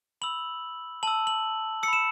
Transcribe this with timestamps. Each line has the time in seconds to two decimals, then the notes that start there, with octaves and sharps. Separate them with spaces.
0.22 B5 E6 F#7
1.03 A5 E6 F#7
1.27 F#7
1.83 E6 C#7
1.88 B5 E7